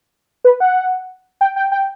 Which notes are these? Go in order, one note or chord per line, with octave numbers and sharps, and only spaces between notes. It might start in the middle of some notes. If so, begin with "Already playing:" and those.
B4
F#5
G5
G5
G5